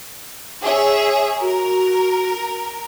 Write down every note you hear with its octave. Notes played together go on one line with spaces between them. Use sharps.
G#4 C#5 E5
F#4 A#4